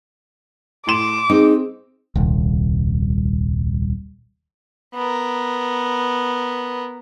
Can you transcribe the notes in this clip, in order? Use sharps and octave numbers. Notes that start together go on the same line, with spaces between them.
A2 C6 D6 E7
C4 D#4 G#4
D#1 C2
B3 A#4